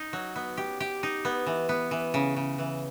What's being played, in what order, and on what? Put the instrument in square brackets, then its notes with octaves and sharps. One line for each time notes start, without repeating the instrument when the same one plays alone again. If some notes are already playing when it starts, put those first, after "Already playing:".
Already playing: [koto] D#4
F#3
B3
G4
G4
D#4
B3
E3
B3
E3
C#3
C#3
E3